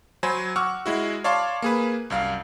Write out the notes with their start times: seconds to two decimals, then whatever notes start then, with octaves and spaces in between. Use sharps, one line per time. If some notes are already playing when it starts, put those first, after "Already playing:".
0.23 F#3 C5 G#5 B5
0.56 F#5 C#6 D6 E6 F6
0.86 G#3 E4 F#4
1.24 C#5 D5 F5 A5 C6 D6
1.62 A#3 G#4 B4
2.10 C2 F#2 F5